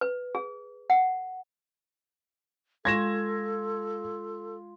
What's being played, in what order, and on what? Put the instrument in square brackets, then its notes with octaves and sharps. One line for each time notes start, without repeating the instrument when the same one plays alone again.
[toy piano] B4
G#4
F#5
[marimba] G#3 C#6 [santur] F4 [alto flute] A4 [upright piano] G#6 A#6 E7